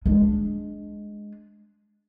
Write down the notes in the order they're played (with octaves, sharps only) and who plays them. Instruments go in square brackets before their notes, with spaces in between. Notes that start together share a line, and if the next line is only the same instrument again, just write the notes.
[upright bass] G#3 D4